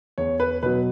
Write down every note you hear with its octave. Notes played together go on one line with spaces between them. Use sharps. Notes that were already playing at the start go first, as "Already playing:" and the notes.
E2 C#5
B4
B2 F#3 B4